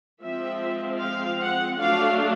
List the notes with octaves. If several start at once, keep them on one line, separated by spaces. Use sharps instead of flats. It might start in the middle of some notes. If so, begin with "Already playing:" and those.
F3 G#3 C4 E5
F5
F#5
F#3 A3 D4 F5